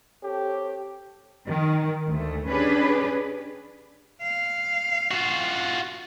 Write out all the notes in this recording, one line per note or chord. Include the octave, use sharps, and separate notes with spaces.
C4 G4 A4 C#5
D#3
D2 A3
C#4 D4 G4 G#4 B4
F5
F4 F#4